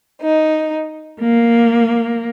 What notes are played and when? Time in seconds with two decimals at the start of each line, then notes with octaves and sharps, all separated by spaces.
0.21 D#4
1.19 A#3